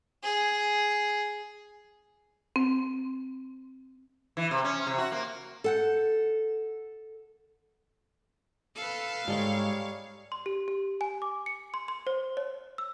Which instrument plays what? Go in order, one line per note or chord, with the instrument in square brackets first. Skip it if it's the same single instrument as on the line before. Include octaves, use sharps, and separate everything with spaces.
[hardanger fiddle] G#4
[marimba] C4
[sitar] E3
C3
C#4
C3
F#4
A#3
[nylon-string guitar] A4 F#5 G5
[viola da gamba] A4 B4 [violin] F5
[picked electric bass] G#2 [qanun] G3 A4 C#6 [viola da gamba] G#3 C#5
[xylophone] C6
G4
G4
G#5
D6
C#7
C6
C6
C5
C#5
E6